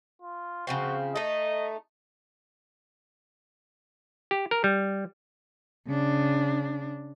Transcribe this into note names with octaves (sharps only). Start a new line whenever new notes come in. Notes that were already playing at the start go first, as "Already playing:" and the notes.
F4
C#3 F3 C4 F#4
A3 D#4 D#5
G4
A#4
G3
C#3 D4